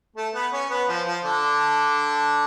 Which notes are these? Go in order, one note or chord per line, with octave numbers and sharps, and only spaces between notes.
A3 A4
B3 B4
C#4 C#5
B3 B4
F3 F4
F3 F4
D3 D4